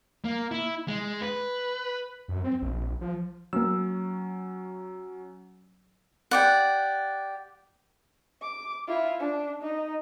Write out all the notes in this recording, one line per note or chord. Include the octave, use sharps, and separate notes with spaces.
A#3
E4
G#3
B4
F#2
C4
A#1
F3
F#3 A#3 C#4 E6
G4 D5 F#5
D6
E4 F4
D4
D#4